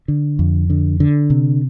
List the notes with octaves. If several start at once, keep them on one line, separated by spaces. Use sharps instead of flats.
D3
F2
D3
D3
C3